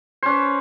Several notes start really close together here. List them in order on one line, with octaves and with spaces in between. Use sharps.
C5 C#4 B4